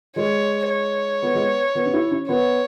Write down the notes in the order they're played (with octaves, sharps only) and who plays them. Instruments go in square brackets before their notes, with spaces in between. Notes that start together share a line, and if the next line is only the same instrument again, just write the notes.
[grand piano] G#3 [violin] C#5
[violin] C#5
[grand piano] B3
G#3
B3
B3
C#4
E4
C#4
[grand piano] B3 [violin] C#5